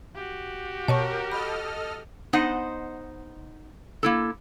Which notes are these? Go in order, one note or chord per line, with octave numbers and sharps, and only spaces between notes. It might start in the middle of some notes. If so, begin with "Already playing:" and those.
F#4 G4
B2 A#4 C#5 A5 C#6
A4 D#5 B5 F6
B3 D#4 C5 D#5 F#5
A#3 E4 A4